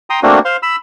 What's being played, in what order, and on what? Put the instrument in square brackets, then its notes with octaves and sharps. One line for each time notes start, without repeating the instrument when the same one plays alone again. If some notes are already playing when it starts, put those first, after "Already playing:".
[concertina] G5 A#5 C6 D#6
A3 A#3 C4 D4 F#4
C5 F5 C6
B5 E6